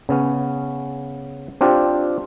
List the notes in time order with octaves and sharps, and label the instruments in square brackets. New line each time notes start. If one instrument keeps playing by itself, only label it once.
[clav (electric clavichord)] C#3 B3 C#4
C4 D4 F4 G4